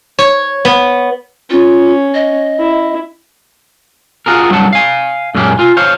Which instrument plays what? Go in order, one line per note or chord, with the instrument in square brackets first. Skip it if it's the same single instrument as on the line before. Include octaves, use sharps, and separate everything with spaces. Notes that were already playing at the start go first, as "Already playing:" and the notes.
[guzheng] C#5
B3
[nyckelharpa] C#4 [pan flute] F4
[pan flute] D#5
[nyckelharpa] E4
[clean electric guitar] F4 F#4 G#4 A#4
C2 G2 F#3 F#5 A5
F5 G#5
F#2 A#2 G#3 A#3 C#4 G4
F4 G#5
C5 C#5 F5